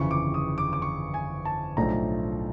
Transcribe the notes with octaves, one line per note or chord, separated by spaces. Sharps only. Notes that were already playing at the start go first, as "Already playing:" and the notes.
Already playing: G1 F2 C#3 E3 C#6
D6
D#6
D6
D6
C#6
G#5
A5
B1 A2 F3 A3 D4 A#5